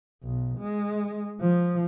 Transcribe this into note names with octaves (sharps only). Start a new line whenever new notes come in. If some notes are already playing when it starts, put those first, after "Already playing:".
B1
G#3
F3